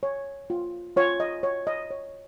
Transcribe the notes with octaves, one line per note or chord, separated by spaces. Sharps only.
C#5
F4
F4 C#5
D#5
C#5
D#5
C#5